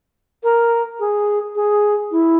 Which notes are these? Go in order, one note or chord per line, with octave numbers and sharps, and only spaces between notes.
A#4
G#4
G#4
E4